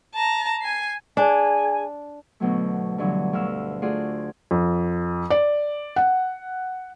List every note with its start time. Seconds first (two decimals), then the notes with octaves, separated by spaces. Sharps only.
0.15 A5 A#5
0.61 G#5 C7
1.17 D4 G#4 G#5
2.40 D2 B2 F#3 A3
2.98 G2 D3 E3 F#3
3.33 D2 F5 E6
3.82 A3 F4 F#4 G#4 D5
4.51 F2
5.30 D5
5.96 F#5